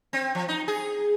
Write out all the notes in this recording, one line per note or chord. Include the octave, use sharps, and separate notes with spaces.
C4
F3
D#4
G#4